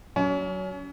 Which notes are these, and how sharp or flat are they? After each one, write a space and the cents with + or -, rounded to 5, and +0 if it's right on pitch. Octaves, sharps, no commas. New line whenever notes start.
F#3 +10 C#4 +30